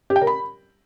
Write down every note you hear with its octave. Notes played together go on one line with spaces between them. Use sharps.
G4
G5
A#4
B5